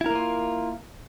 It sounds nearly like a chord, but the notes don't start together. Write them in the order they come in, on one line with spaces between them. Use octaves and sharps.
E4 A#4 A#3 F4